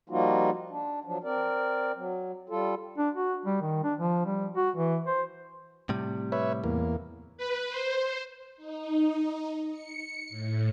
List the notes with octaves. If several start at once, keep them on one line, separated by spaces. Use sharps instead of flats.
F3 G3 A#3 D#4 F4 F#4
D4
F3 F#3 D4
C4 A#4 D5
F#3
G3 F4 A4
D4
F#4
G3
D#3
D4
F3
G3
F#4
E3
C5
A2 C3 G3
B4 C#5 E5
E2 A#3
B4
C5
D#4
C#7
A2